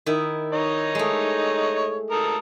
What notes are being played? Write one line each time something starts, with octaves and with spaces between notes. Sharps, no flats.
D#3 E4
D#4 C#5 D#5
G#3 A3
A4 A#4 D#6